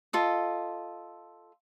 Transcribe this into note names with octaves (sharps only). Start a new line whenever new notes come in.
F4 A4 D#5